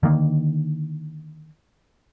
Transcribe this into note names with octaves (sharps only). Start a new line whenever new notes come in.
D3 D#3 A#3